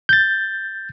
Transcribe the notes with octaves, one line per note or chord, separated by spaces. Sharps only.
G6 A6